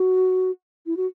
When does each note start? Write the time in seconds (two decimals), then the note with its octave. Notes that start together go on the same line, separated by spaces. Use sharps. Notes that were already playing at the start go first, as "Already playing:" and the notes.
Already playing: F#4
0.86 E4
0.97 F#4